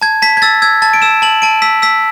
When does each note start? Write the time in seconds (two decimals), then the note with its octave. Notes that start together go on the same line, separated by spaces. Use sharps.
0.02 A5 G#6
0.22 A5 B6
0.37 G#6
0.42 E6 A6
0.62 E6 G#6
0.82 A5 A6
0.94 D7
1.02 E6 E7
1.22 A5 F#7
1.42 A5 D7
1.62 E6 B6
1.82 E6 B6